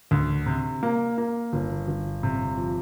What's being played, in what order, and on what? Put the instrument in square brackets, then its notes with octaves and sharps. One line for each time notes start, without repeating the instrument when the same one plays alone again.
[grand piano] D2
C3
A#3
A#3
G1
G1
C3
F3